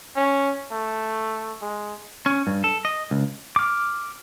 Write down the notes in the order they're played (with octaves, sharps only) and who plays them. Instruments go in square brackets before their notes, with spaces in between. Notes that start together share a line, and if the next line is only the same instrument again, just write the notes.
[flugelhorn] C#4
A3
G#3
[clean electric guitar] C#4
G2
A4
D#5
C#2
[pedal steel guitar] D6 F6